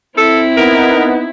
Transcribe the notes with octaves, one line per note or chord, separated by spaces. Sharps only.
C4 E4 A4
B3 D#4 A#4